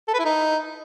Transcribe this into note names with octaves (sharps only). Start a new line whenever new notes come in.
A4
B4
E4
D#4